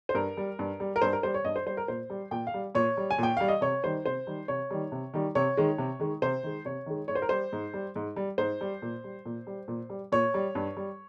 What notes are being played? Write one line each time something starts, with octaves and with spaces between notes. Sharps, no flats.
C5
G2 A#4
G3
G2
G3
A#4
G2 C5
A#4
G3 C5
C#5
G2 D#5
C5
G3 C5
A#4
A#2 C5
G3
A#2 G5
F5
G3
A#2 C#5
G3
G#5
A#2 G5
G3 F5
D#5
C3 C#5
D#3 G3 C5
C3 C5
D#3 G3
C3 C#5
D#3 G3
C3
D#3 G3
C3 C#5
D#3 G#3
C3
D#3 G#3
C3 C5
D#3 G#3
C3 C#5
D#3 G#3
G#2 C#5
C5
A#4
G3 C5
G#2
G3
G#2
G3
G#2 C5
G3
A#2
G3
A#2
G3
A#2
G3
A#2 C#5
G3
G2
G3